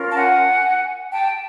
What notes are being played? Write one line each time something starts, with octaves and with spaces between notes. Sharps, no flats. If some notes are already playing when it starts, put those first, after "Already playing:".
Already playing: C#4 F4 A#4
A5
F#5 G#5
G5 A5